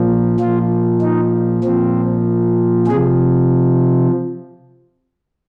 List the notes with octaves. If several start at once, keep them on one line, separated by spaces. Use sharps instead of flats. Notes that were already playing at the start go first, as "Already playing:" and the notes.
Already playing: A#2 F3
A#2 F3 F4
D#4
A#2 F3 C4
C3 F3 G#4